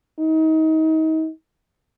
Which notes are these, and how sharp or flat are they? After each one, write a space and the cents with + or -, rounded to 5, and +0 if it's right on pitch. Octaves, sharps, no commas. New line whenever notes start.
D#4 +30